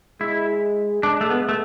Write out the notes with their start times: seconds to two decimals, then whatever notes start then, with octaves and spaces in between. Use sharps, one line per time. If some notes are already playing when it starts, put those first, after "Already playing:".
0.21 G#3 E4
1.03 G#3 D4
1.21 A3
1.30 B3
1.49 A3